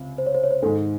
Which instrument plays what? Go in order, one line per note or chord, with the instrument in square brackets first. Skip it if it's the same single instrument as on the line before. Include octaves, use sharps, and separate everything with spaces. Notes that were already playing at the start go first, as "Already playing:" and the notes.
Already playing: [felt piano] C#2 C3
[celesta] C5
C#5
C5
C#5
C5
[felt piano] G#2 D#3 G#3 D#4 [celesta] A4